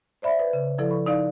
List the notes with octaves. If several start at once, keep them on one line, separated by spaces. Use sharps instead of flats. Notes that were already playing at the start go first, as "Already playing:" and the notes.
C5 D5 E5 B5
B4
C#3
F3 E4 A4 D5
B5 C#6
D#4 D5 F5